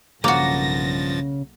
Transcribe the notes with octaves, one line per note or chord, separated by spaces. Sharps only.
B1 G2 C#3 F3 A#3 F#4 A6 A#6